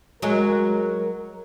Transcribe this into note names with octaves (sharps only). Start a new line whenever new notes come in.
F#3 G#3 A#4